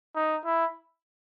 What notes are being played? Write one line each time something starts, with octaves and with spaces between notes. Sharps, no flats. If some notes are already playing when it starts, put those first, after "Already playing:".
D#4
E4